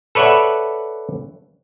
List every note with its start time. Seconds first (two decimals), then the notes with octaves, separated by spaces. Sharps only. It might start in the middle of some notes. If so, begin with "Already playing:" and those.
0.15 A4 B4 C#5 D5 E5 F#5